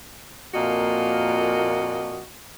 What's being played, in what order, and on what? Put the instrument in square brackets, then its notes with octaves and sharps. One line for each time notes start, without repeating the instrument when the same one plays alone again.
[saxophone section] F2 A#2 A#3 F#4 D#5